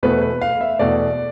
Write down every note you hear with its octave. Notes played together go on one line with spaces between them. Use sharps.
E2 B2 A3 B4
B4
F5
E5
E2 B2 A3 D5